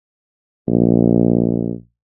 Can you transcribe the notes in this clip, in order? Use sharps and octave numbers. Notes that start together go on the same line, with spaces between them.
A#1